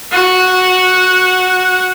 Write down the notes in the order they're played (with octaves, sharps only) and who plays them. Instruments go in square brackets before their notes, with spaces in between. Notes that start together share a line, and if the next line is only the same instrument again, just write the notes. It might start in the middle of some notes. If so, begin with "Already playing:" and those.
[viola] F#4 F#5